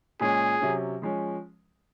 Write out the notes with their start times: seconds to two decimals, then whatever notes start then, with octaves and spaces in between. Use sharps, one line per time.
0.20 A#2 G#3 C#4 G#4
0.61 C3 F#3 C#4
1.02 F3 G#3 C#4